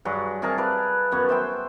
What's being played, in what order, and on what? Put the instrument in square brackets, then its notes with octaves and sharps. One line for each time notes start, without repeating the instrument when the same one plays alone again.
[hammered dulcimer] G2 F#3 G#4
C3 G#4 A#4 A5
B4 D5 F5
F#2 B3 C#5
C5 E5 G5